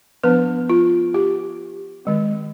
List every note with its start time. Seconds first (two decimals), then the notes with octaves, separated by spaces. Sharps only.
0.24 F3 B3 D4 B4
0.70 F4
1.14 G4
2.05 D#3 G#3 C4